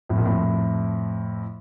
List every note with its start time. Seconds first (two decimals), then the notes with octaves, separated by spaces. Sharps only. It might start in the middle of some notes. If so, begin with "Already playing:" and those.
0.09 F2 A2
0.17 A#2
0.25 F2 A2